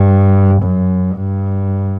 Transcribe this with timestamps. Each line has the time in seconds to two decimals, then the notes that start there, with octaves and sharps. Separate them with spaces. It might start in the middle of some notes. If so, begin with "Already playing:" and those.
Already playing: G2
0.61 F#2
1.17 G2